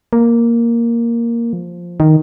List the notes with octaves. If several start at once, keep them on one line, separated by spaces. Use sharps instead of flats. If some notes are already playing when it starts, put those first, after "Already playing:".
A#3
F3
D#3